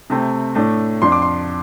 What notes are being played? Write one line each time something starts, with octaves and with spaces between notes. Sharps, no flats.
C3 A3 C4
A2 A3 D4
F2 F3 D4 C6
D6
C6